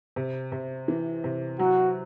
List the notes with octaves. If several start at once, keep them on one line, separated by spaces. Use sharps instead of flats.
C3
C3
E3
C3
F#3 F#4